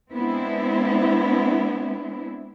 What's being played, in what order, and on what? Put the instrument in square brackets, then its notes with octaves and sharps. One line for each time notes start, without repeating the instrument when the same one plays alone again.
[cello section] G#3 B3 C4 D4 E4